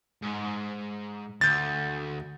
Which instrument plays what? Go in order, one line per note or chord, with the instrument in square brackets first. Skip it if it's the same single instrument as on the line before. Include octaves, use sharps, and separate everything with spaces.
[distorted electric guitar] G#2
[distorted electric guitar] D2 [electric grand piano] G6 A6